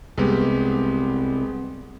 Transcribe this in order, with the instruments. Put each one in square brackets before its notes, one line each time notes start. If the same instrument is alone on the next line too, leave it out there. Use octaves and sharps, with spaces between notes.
[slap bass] C2 [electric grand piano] G#3 B3 G4